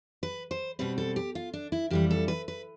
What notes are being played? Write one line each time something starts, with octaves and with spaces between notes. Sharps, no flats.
B4
C5
B2 G3 C4 B4
A4
G4
F4
D4
E4
F2 E3 G3 G4
A4
B4
B4